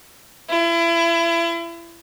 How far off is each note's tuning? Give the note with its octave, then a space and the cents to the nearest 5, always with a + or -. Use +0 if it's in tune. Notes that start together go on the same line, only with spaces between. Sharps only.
E4 +35